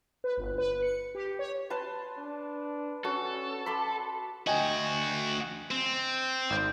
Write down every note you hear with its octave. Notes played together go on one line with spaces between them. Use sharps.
B4
G1
B4
C#7
G4
C#5
B4 A5 C6
D4
C#4 F#4 A4
A5 B5 C6 D6
D2 F#4 D#5 G5 G#5
C4
G#1 G6